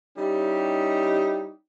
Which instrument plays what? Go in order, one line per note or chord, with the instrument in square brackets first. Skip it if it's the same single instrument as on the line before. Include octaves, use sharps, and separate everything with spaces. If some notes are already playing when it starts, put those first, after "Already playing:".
[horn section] G3 C#4 D#4 E4 G4